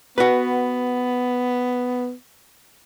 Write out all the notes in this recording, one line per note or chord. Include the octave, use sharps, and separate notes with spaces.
B3 F#4 B4